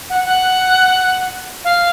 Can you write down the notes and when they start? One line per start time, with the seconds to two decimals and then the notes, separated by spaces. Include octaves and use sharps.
0.09 F#5
0.25 F#5
1.64 F5